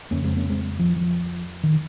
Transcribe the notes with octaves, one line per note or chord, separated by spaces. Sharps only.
F2 C#3 A#3 C#4
G#3 C4
A#3 C#4
G#3 C4
F3
F3
D#3